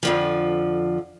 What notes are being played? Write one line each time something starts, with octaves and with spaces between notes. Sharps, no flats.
F2 D3 F3